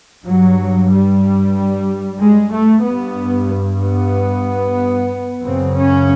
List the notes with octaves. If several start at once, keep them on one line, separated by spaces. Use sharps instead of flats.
G2 F#3
G3
G#3
A3
G2 B3
B3
F#2 C#3 C4
C#4